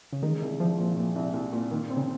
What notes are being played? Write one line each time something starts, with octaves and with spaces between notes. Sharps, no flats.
C#3
D#3 G#3
C2
C2 F3
A#2
A#2
C2
C2
A#2
A#2 D#3
C4
C#3